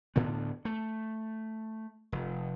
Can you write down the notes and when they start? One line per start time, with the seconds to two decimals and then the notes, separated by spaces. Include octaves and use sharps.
0.16 D2 A2 D3 B3
0.65 A3
2.12 F1